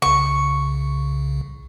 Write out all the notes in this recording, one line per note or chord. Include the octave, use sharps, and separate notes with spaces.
C2 C#3 C#6